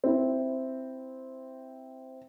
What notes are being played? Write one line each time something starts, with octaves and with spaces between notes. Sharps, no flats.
C4 E4